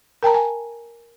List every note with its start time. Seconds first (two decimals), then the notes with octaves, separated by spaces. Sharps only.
0.23 A#4 G5 A5 A#5
0.34 G#5